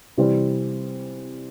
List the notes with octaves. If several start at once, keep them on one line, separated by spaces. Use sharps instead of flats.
C3 E3 G3 C4